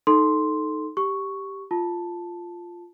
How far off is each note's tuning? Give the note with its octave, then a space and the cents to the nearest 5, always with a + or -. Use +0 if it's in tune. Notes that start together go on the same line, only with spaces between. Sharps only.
D#4 +0 A4 -10 C6 +0
G4 +0 C#6 +0
F4 +0 A5 +0